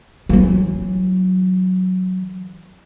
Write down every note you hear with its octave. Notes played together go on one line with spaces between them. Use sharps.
E3 F#3